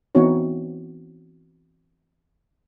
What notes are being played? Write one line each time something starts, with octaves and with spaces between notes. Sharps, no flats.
E3 B3 C4 D#4 F#4 C#5